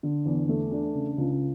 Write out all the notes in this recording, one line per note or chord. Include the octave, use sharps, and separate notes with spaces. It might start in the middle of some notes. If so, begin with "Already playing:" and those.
D3
E2
A3
D4
C#3
C#2